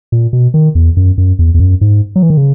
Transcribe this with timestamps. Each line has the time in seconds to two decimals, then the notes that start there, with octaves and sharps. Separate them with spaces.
0.12 A#2
0.33 B2
0.54 D#3
0.75 E2
0.97 F#2
1.18 F#2
1.39 E2
1.54 E2
1.60 F#2
1.81 G#2
2.16 F#3
2.23 E3
2.30 D#3
2.37 C#3